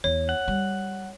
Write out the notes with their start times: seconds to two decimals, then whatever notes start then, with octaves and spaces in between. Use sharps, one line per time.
0.04 E2 C#5
0.29 F#5
0.48 G3